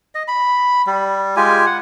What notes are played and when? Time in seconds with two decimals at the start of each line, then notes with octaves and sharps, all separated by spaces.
0.15 D#5
0.28 B5
0.87 G3
1.36 G#3 F4 G4 G#5
1.66 F#5